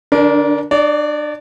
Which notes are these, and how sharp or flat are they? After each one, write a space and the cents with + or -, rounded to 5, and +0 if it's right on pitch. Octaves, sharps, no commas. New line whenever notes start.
D3 +25 D4 -20 A#4 +25
D4 +30 D5 -30